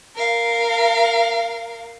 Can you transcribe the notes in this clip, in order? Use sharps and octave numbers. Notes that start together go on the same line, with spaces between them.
A#4 F5